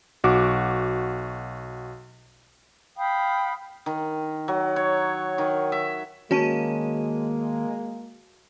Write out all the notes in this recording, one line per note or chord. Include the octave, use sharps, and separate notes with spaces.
B1 F#4 D6
F5 G5 B5 D#6
D#3
F#3
C#5
D#3
E5
D#2 G#3 A#3 C#4 F#4 A5 D#7